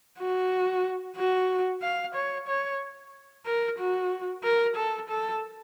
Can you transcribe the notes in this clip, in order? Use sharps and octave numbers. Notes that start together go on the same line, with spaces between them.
F#4
F#4
F5
C#5
C#5
A#4
F#4
A#4
A4
A4